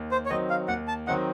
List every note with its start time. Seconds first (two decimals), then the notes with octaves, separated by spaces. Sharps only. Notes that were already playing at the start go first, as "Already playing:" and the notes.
Already playing: D#2
0.11 C5
0.26 C#5
0.30 D#3 F#3 C4 D#4 D#5
0.50 F5
0.68 D#2 F#5
0.88 A5
1.07 D#3 F#3 C4 D#4 F#5